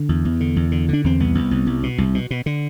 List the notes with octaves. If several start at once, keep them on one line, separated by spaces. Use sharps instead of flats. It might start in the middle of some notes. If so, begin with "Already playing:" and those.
Already playing: D3
E2
E2
D3
E2
D3
D3 D4
E2 C4
C2 B3
C2
C2
C2
B2
C2
B2
B2
D3